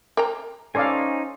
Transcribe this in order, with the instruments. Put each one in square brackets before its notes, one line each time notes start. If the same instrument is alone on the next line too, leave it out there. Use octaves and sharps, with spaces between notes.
[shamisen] A#4 G5 A#5
[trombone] C#4 [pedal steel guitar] D#4 C5 G#5 [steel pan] A4 D5 F5